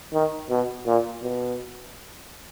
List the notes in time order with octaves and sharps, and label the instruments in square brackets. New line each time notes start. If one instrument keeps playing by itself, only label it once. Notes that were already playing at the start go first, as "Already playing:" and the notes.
[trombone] D#3
B2
A#2
B2